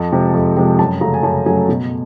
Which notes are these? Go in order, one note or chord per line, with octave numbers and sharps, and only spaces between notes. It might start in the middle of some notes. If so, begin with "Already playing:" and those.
Already playing: F2 A5
C3 F3 G#3
F2
C3 F3 G#3
F#2 A5
C#3 F#3 A3 A#5
G#5
F#2 A5
C#3 F#3 A3 G#5
B2